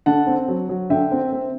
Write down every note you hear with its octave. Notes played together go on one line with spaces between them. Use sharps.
D3 F#5 A5
C4
F#3
F#3
D3 E5 G5
C4
C4